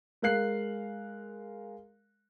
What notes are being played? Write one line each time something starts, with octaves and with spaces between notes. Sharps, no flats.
G#3 A#4 F5 F#6 C7